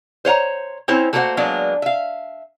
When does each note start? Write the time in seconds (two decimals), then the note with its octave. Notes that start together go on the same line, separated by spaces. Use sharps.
0.25 C5 C#5 F#5 A#5
0.88 C4 C#4 E4 C5 C#5
1.13 A3 A#3 F#4 B4 C5 F#5
1.37 F#3 G#3 A#3 B3 D4
1.82 E5 F5